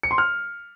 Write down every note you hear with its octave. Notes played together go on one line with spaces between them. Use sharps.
C#7
C6
F6